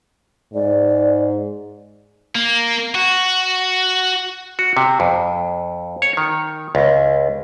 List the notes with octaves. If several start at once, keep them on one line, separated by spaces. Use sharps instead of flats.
G#2 D5
A#3
F#4
F#4
C3
F2
C#5
D#3
C#2